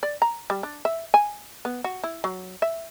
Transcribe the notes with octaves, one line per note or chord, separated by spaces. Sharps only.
D5
A#5
G3
D4
E5
G#5
B3
F#4
E4
F#3
E5